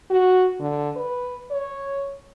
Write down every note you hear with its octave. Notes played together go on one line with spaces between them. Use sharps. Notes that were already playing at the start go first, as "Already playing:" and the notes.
F#4
D3
B4
C#5